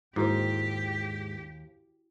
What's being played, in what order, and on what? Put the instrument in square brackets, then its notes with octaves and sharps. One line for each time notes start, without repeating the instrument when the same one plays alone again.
[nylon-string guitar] D#2 C5 [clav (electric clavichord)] G#2 [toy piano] E4 F#4 D6 [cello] G4 G5